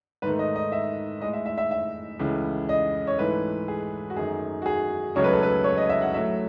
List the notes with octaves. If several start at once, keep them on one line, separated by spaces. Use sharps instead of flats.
G#2 D#3 A3 B4
D#5
D#5
E5
A2 G#3 D#5
E5
E5
E5
E5
C#2 C#3 E3 A3
D#5
C#5
G#2 E3 A3 B4
G#4
F#4
F#2 D#3 A3 G#4
F#4
G#4
C#2 C#3 F#3 A3 C#5
B4
A4
B4
C#5
D#5
E5
F#5
A2 F#3 A3 E5